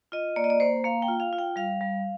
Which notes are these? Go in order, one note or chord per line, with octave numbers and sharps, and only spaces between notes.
F4 D#5
A#3 D5
D#5
D5
A#3 C5
A#3 F5
G5
F4
F5
F4
G5
G3 F5
G3